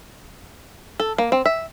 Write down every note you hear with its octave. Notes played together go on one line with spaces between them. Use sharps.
A4
A#3
C4
E5